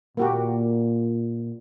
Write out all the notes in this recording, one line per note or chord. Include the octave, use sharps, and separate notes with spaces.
A#2 A#3 F#4 G4